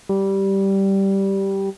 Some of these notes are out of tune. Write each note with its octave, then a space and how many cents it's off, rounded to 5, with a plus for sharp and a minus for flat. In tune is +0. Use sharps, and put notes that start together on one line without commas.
G3 -10